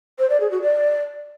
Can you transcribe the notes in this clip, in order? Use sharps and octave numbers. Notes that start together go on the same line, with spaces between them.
C5
D5
G#4
F#4
D5